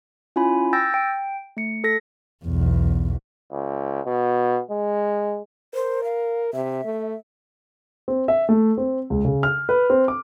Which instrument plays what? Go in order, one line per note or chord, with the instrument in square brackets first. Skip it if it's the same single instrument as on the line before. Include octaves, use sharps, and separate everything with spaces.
[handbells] C#4 E4 F4 G#5 B5
G5 E6 G6 A6 A#6
G5
A3 C#7
A4 A#6 B6
[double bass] B1 E2
[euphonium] C#2
B2
G#3
[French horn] A#4 [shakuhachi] C5
[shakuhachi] F5
[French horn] C3 [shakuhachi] E5
[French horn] A3
[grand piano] C4
E5
A3
C4
C#2
C#3
F6
B4
C4
D6